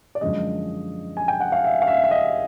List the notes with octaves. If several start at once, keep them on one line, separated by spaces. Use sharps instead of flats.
D5
F#2 D3 F3 G#3 D#5
G#5
G5
F#5
F5
E5
F5
E5
E5
D#5